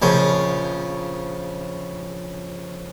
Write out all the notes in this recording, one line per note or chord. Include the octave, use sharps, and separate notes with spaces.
A#1 C#3 F3